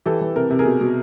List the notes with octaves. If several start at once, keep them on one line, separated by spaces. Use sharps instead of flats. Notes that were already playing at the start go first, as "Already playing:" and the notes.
E3 G4 A4
E3
C3 A#4
C3
G#4 A#4
B2
B2